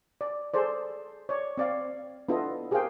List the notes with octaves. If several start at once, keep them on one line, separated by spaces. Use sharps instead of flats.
D5
G#4 A4 C5 D5
C#5 D5
C4 D5 F5
B3 D4 E4 F4 A4 D#5
G4 G#4 A#4 C5 F5 G5